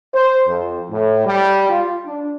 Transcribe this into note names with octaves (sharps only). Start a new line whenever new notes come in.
C5
F2
A2
G3
F4
D4